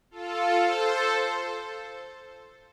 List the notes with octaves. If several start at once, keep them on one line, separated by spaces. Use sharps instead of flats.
F4 A4
A4 C5